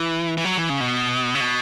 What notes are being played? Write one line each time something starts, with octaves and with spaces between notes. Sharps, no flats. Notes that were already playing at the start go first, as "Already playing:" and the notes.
Already playing: E3
E3
F#3
E3
C#3
B2
C#3
B2